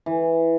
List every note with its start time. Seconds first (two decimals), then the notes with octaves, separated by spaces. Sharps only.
0.06 E3